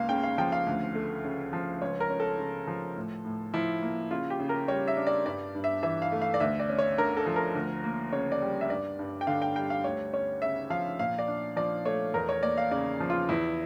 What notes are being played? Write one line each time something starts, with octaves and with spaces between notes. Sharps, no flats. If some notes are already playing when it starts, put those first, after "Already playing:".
Already playing: C#2 A#3 F5
C#3 G5
F5
F3 G5
F5
D2
A3
C#3
F3
C#2 C#5
A#4
C#4
A4
C#3
F3
A2
A2
F3 E4
A#3
C#3 F4
G4
C#3
A#4
G3 C#5
E5
D4
D5
G2 D5
G2
E5
E3 E5
F5
A3
F5
D5
D2 E5
D5
C#4
C#5
D3 A#4
A4
F3
A#4
D2
A#3
C#3 C#5
D5
G3
E5
G2 D5
G2
G5
D3 F5
G5
G3 G5
F5
D2 C#5
C#4 C#5
C#3 E5
F3 F5
A#2 F5
D5
D4
F3 D5
A3 C#5
E2 A#4
C#5
A#3 D5
F5
C#3 D5
F3
F4
E2 E4